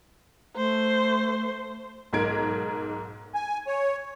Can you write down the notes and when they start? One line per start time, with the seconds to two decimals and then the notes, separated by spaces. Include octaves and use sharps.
0.56 A3 C5
2.13 B1 G#2 A#4 G#6 D7
3.35 G#5
3.67 C#5